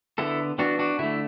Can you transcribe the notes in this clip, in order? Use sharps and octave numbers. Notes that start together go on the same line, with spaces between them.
D3 B3 E4 A4
E3 B3 D4 F#4
D4 F#4
D3 A3 E4